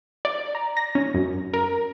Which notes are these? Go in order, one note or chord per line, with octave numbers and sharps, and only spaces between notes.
D5
A#5
A#6
C#4
F#2
A#4